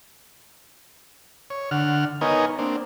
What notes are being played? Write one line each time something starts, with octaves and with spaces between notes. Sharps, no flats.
C#5
D3 F#5 F6
B3 D#4 A#4 C#5 D#5 G#5
A#3 C4 D4